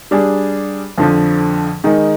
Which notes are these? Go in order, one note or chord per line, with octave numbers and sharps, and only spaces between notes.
G3 D4 G#4
F2 D3 F3
D#3 G#3 D#4